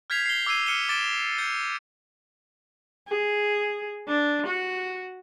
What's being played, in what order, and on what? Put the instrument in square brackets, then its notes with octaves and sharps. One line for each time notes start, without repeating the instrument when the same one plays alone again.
[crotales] F6 G6 G#6 B6 C7 F7
C7 G7
D6 E6 G#6 C7 D#7
D6 F6 C#7 D#7 E7 G7
D6 A6 D7 E7 G7
G6 A6 C#7
[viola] G#4
D4
F#4